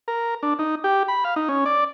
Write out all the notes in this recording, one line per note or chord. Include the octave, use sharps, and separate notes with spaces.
A#4
D4
D#4
G4
B5
F5
D#4
C#4
D5